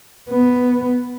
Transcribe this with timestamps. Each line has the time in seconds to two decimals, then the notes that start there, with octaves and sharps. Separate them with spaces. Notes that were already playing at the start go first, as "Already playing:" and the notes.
0.30 B3